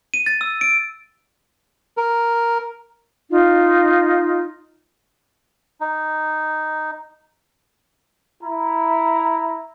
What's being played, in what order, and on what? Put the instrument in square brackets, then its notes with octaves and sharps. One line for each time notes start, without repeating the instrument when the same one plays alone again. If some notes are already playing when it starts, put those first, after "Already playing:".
[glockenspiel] D#7
A6
E6
D7
[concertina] A#4
[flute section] D#4 F4
[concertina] D#4
[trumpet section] E4 A#5